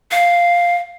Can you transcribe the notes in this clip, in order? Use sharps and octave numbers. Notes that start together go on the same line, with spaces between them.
F5